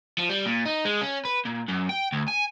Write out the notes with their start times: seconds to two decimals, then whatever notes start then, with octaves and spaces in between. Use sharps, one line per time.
0.19 F3
0.30 G3
0.46 A#2
0.66 D#4
0.85 G#3
1.01 C#4
1.25 B4
1.45 A#2
1.69 F#2
1.89 G5
2.12 D2
2.28 G#5